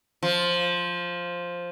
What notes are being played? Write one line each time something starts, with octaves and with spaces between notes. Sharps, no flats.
F3